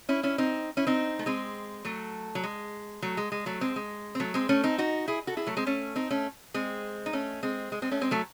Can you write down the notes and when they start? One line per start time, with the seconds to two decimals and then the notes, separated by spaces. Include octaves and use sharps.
0.09 C#4 E4
0.23 C#4 E4
0.38 C4 D#4
0.77 C#4 E4
0.87 C4 D#4
1.19 A3
1.26 G#3 C4
1.85 F#3 A3
2.35 F#3
2.43 G#3
3.02 F#3 A3
3.17 G#3
3.32 G#3
3.46 F#3 A3
3.61 G#3 C4
3.76 G#3
4.15 C4
4.20 F#3 A3
4.34 G#3 C4
4.49 A3 C#4
4.64 C4 D#4
4.78 D#4 F#4
5.08 E4 G#4
5.27 F#4 A4
5.37 E4 G#4
5.47 F#3 A3
5.57 G#3 C4
5.66 A3 C#4
5.96 C4 D#4
6.11 A3 C#4
6.54 G#3 C4
7.06 D#4
7.13 A3 C#4
7.43 G#3 C4
7.72 G#3
7.82 G#3 C4
7.91 A3 C#4
8.01 G#3 C4
8.11 F#3 A3